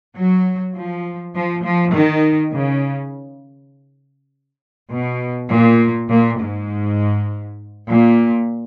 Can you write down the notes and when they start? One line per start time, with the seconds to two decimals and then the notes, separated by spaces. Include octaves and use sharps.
0.16 F#3
0.76 F3
1.35 F3
1.65 F3
1.94 D#3
2.54 C#3
4.91 B2
5.51 A#2
6.10 A#2
6.40 G#2
7.88 A#2